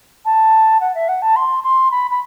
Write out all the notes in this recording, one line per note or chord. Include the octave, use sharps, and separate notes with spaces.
A5
F#5
E5
F#5
A5
C6
C6
B5
B5